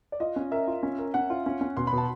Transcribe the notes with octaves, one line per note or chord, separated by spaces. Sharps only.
D5
F4 D#5
C#4
A#4 E5
F4
C#4
A#4
C#4 F#5
F4
C#4
C#4
B2 C6
B5
B2
A5